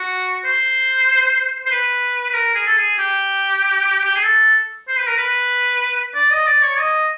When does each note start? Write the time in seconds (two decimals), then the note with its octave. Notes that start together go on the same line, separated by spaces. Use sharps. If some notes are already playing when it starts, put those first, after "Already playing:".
Already playing: F#4
0.45 C5
1.66 C5
1.71 B4
2.30 B4
2.34 A#4
2.55 G#4
2.66 A4
2.77 G#4
2.98 G4
4.05 G4
4.15 G#4
4.24 A4
4.88 C5
4.97 B4
5.07 A#4
5.17 B4
6.15 D5
6.32 D#5
6.47 D5
6.62 C#5
6.78 D#5